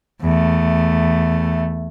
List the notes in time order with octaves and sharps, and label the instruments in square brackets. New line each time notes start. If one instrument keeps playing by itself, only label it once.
[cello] E2 A3